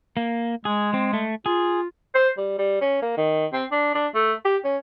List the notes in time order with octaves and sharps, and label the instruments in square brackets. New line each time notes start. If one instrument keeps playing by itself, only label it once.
[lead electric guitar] A#3
[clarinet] G#3 [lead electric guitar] G#4
[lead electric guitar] C4
A3
[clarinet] F4 [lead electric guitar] G#4
[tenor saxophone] C5
G3
G3
C#4
A#3
D#3
C4
D4
D4
A3
G4
C#4